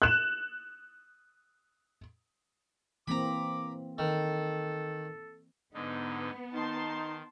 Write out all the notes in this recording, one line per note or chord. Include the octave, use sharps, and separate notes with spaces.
F#6 E7
E3 A#3 C4 A#5 B5 D6
D#3 A4
G#2 D3 B3 D#4
D#3 D#4 A5 C6